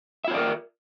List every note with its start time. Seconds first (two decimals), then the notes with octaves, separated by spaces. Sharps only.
0.24 E5
0.28 F4
0.31 C#5
0.34 D5
0.37 A#4